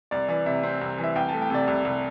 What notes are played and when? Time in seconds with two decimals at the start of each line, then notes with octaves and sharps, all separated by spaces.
0.11 C2 D5
0.28 E3 D5
0.46 C3 E5
0.63 C4
0.81 C2
0.98 E3
1.04 E5
1.16 C2 G5
1.29 A5
1.33 A3
1.42 G5
1.50 C3 D5
1.67 C2
1.85 C2